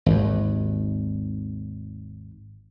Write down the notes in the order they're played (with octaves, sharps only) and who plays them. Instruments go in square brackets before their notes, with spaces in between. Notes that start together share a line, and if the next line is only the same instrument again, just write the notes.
[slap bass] G#1 D#2